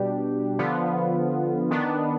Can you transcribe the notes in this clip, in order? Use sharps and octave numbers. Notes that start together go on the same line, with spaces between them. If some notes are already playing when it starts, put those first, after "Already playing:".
Already playing: B2 G3 D4 G4
D3 F3 B3 F4
D#3 B3 D4